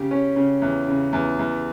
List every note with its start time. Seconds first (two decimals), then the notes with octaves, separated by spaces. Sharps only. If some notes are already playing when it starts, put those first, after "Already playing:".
Already playing: C#3 G4
0.11 C#4
0.36 C#3
0.62 E2
0.88 C#3
1.13 E2
1.39 E2